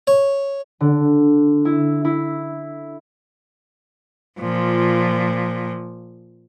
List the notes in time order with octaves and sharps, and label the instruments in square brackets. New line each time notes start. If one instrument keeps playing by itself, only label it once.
[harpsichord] C#5
[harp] D3
E4
E4
[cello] A#2 F3